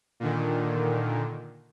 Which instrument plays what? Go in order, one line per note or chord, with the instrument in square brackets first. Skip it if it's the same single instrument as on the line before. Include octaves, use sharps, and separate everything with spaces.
[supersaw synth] A#2 D3 D#3